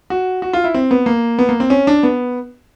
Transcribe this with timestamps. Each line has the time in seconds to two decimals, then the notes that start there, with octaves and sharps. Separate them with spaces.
0.10 F#4
0.42 F#4
0.53 F4
0.64 E4
0.74 C4
0.91 B3
1.06 A#3
1.39 B3
1.49 A#3
1.60 C4
1.70 C#4
1.87 D4
2.03 B3